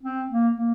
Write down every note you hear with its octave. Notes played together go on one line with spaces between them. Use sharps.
C4
A#3
A#3